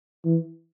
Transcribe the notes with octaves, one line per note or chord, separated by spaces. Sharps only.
E3